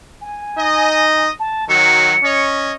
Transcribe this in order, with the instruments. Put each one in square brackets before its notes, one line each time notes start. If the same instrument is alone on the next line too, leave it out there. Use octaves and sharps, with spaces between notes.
[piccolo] G#5
[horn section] D#4 D#5
[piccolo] A5
[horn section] D#3 F#3 [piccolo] C#7
[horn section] C#4 C#5 D#5